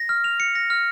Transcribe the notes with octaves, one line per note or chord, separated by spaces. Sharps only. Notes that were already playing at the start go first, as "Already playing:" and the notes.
Already playing: A#6
F6
F7
C#7
A#6
F6